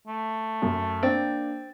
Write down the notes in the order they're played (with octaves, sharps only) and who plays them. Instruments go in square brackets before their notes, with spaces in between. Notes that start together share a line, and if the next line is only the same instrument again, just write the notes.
[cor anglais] A3
[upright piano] F#2
[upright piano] A#3 D4 A6 [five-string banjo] C4